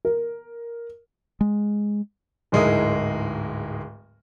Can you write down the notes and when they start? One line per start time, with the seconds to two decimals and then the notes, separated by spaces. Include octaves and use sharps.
0.05 A#4
1.41 G#3
2.52 D1 G#2 G#3 E4 A#4 D#6